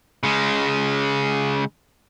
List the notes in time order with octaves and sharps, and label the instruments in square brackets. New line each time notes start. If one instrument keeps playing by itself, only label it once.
[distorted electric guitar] C#3 G#3